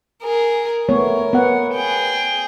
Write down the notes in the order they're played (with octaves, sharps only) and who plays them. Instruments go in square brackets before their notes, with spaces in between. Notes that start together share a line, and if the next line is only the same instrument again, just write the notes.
[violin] G#4 A#4
[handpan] A3 B3 C#5 [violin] A#4
[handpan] B3 F#5
[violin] G#4 G5